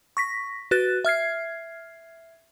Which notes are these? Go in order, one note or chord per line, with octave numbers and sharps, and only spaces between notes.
C#6 A#6 B6
F#4 B4 F#6 A6
E5 F6 G#6 C7